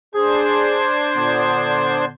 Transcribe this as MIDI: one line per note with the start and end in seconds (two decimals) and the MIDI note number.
0.15 2.05 62
0.15 0.86 68
0.15 2.05 72
0.15 2.05 92
1.16 2.12 46
1.16 2.12 50
1.16 2.12 59